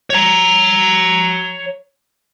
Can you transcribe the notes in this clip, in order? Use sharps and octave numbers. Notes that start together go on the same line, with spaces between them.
C#5 A#5